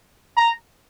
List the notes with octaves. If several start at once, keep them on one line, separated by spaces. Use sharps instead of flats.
A#5